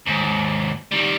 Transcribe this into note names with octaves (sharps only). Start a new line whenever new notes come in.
D#2 G#2
D#3 G3